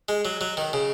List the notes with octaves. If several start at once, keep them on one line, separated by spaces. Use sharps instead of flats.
G#3
F#3
F#3
D#3
C#3